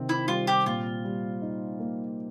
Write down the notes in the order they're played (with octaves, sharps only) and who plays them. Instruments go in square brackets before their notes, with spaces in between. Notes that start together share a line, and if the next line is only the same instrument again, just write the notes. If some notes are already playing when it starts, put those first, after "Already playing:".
Already playing: [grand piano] C3 D#3 C4
[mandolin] E4
[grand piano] G3 [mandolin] F4
[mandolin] G4
[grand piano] A#2 [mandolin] F4
[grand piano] G3
D#4
A#3